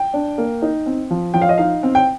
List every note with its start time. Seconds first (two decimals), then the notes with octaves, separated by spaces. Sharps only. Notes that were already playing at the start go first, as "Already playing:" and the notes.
Already playing: G5
0.14 D4
0.38 A#3
0.62 D#4
0.86 C4
1.11 F3
1.34 F3 G5
1.42 F5
1.49 D#5
1.58 D#4 F5
1.83 C4
1.95 G5